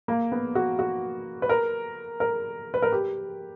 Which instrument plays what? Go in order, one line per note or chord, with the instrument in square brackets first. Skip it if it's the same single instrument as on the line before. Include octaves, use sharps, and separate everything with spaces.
[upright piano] A#3
B3
F#4
F#4
B4
A#4
A#4
B4
A#4
G4